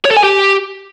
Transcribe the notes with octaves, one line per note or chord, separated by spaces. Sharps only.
C#5
A4
G#5
G4